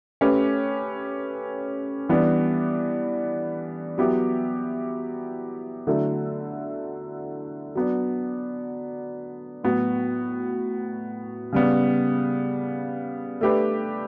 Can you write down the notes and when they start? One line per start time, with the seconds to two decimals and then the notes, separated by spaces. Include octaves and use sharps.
0.21 A3 C#4 G4 B4
2.09 E3 G3 B3 D4
3.98 F#3 B3 E4 G4
5.87 D3 F#3 A3 E4
7.75 F#3 B3 D4
9.64 A2 F#3 B3 F#4
11.52 C#3 G3 B3
13.41 A3 D4 G4 B4